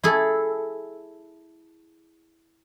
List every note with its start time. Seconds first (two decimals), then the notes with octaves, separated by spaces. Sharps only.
0.04 E4 G#4 A4